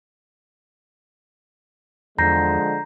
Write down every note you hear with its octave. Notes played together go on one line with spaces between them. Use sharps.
E2 D3 F3 G#3 A#5 G6 A#6 C7